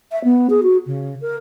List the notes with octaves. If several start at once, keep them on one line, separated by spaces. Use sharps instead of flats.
E5
B3
G#4
F#4
C#3
A#4